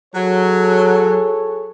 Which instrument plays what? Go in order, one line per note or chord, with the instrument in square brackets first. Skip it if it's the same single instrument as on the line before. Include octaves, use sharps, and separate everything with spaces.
[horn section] F#3 [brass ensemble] G#4 A4 C#5